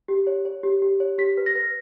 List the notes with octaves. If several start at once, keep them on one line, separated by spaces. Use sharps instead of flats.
G4
C#5
C#5
G4
G4
C#5
G4 B6
B4
A#6
B4